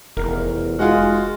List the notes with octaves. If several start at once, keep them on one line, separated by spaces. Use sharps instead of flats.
F1 E2 A#4
G#3 F4 F#4